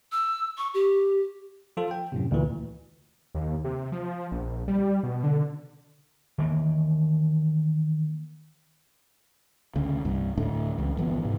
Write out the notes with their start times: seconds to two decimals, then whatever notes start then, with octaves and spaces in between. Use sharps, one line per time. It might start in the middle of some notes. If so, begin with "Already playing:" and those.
0.12 E6
0.58 C#6
0.74 G4
1.77 F3 F4 A4
1.91 G5
2.12 F#2 A2 C3
2.31 D2 A#2 E3
3.34 D#2
3.64 C3
3.92 F3
4.32 A#1
4.68 G3
5.03 B2
5.23 D3
6.38 D#3 E3 A#3
9.76 D2 C#3
10.05 C2 G2
10.37 D2 A2 A3 D4
10.78 C#2 E3
10.97 G1 E3 F3 B3
11.24 G#2 C3 E3